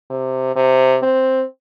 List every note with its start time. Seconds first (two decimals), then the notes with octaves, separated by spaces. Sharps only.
0.10 C3
0.56 C3
1.03 C4